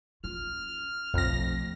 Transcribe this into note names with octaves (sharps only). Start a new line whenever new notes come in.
C#4 F4 F6
B1 F2 A3 A#6